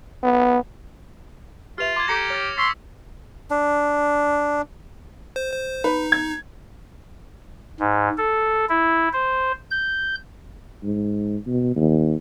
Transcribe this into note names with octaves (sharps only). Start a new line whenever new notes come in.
B3
F4 G4 B4 E5 F6 F7
C6 D6 G#6
G4 A4 A#5 A#6 C7 C#7
C#5 F6 A6
C6 C#6 E6 A6 B6
D4
C5
C5
D#4 B4
G#6
G#2
A4
E4
C5
G6
G#2
B2
D#2